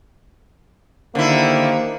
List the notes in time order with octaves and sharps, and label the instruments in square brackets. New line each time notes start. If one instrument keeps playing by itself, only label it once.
[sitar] D3 E4 [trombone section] D#3 G4 C5 [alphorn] A#3